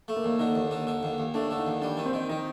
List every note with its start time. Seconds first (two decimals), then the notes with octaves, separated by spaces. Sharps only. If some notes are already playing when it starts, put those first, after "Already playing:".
0.08 A3
0.16 A#3
0.24 D#2
0.40 D3 D#4
0.55 D#2
0.71 D3
0.87 D3
1.03 D#2
1.18 D#2
1.34 A3 D4
1.51 D3
1.59 D#4
1.67 D#2
1.82 G3 D4
1.97 D#3
2.06 C4
2.13 D#3
2.29 D#3 D#4